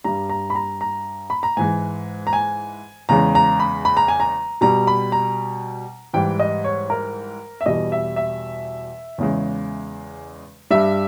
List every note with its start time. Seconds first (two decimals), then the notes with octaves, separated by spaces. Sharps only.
0.04 G2 G3 A#5
0.29 A#5
0.50 B5
0.55 A#5
0.81 A#5
1.30 B5
1.43 A#5
1.57 G#2 E3 G#3 G#5
2.27 A#5
2.33 G#5
3.09 E2 C#3 G#3 A#5
3.35 A#5
3.60 B5
3.85 B5
3.97 A#5
4.08 G#5
4.20 A#5
4.61 B2 G3 A#5
4.87 B5
5.12 A#5
6.14 G#2 E3 G3 G5
6.39 D#5
6.64 C#5
6.90 A#4
7.61 E5
7.66 E2 B2 G3 D#5
7.92 E5
8.16 E5
9.18 E2 C#3 G#3
10.70 G2 G3 E5